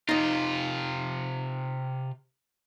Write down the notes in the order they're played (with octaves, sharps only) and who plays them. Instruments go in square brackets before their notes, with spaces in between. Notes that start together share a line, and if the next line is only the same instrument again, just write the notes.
[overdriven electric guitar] C3 F4 [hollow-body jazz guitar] D#4 D#5